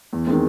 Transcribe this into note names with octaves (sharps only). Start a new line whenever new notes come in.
E2
D#3 G#3 C4